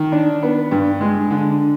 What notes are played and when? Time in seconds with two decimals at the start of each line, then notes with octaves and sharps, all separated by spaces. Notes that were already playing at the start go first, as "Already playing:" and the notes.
Already playing: D#3
0.12 D4
0.43 B3
0.71 G2
1.01 G#3
1.30 D3